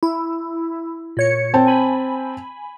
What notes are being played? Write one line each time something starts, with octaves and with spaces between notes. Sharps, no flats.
E4
A#2 C#5 C#7
C4 G5 A5
G#5 B5